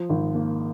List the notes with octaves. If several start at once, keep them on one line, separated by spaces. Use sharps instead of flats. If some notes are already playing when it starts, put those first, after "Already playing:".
Already playing: F3
G#1
A#3